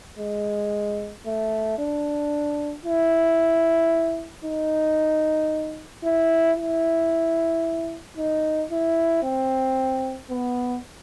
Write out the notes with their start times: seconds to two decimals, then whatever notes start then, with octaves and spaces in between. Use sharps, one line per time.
0.19 G#3
1.26 A3
1.79 D4
2.85 E4
4.44 D#4
6.04 E4
6.57 E4
8.17 D#4
8.71 E4
9.23 C4
10.30 B3